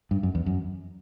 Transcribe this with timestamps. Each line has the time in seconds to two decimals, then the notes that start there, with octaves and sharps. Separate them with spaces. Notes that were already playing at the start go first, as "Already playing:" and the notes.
0.11 G2
0.23 F#2
0.35 E2
0.46 F#2